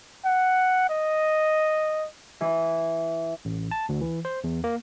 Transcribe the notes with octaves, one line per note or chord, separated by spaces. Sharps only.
F#5
D#5
E3
A1
A5
D2
E3
C5
E2
A#3